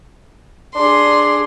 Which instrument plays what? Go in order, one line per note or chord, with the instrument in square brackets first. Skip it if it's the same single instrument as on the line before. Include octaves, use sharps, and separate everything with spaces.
[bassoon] D4 [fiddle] G#4 C6